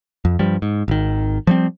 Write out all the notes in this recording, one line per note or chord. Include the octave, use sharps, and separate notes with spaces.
F2
G2 F3 G3
G#2
G#1 D#3
F3 G3 C4